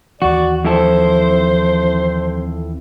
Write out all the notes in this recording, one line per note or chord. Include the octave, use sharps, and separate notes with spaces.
D#2 E3 F#4 D5
F2 E4 A4 C5